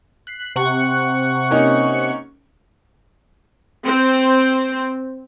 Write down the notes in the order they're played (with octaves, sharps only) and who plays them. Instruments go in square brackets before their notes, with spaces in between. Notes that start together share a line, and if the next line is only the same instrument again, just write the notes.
[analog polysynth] F#6 B6 C7
C3 F#5 C#6
[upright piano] A#3 C#4 D#4
[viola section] C4